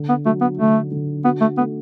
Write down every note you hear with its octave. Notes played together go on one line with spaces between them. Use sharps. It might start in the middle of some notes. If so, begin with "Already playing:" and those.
Already playing: D3
B3
F#3 A3
B3
D3 A3
D3
B3 F#4
A3
A3 B3